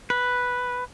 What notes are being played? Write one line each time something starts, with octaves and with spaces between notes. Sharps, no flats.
B4